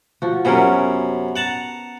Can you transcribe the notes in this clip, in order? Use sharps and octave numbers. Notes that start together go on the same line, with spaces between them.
F3 F#4
F#2 C3 B3 C#4 A#4
F#5 A5 A#5